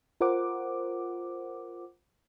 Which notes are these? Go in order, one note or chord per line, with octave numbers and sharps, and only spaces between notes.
F4 A#4 C5 F#5 D6